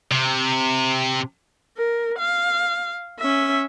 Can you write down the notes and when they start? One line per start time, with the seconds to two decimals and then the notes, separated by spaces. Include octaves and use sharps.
0.11 C3
1.78 A#4
2.19 F5
3.20 C#4 E5